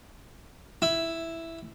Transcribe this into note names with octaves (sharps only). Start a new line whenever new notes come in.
E4